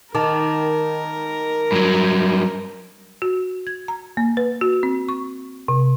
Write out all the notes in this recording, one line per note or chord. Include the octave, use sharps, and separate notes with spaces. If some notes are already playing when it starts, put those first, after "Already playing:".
D#3 A#4 A5 D6
G2 F#3
F#4
G#6
A#5
A#3
B4
F#4
C4
C#6
C3